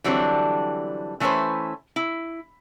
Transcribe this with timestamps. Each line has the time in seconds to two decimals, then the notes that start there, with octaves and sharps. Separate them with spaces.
0.04 D3 E3 F#3 G3 C4 D4
1.20 E3 A3 C#4 E4 B4 C5
1.96 E4